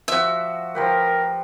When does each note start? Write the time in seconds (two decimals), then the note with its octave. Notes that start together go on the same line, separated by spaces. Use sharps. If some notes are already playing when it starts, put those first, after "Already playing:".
0.08 F3 F#4 E5
0.75 F3 G4 A#4 B4